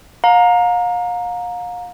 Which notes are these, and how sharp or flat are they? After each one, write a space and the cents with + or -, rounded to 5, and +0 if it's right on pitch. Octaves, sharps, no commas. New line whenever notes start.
F5 +35 A#5 +0